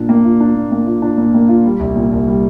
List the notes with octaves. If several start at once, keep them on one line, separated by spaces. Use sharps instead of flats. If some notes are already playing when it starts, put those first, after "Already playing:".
Already playing: A#2 D4
A#3
F4
D4
A#2
A#3
F4
D4
A#2
A#3
F4
G3
C2
A#2
C2
G3